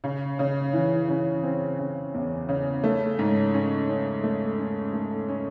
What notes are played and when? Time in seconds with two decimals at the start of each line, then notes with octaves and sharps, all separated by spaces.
0.04 C#3
0.39 C#3
0.73 E3
1.09 C#3
1.43 C4
1.79 C#3
2.14 E2
2.49 C#3
2.84 A3
3.19 G#2
3.54 C#4
3.89 C#4
4.24 A3
4.59 C#4
4.93 A3
5.29 C#4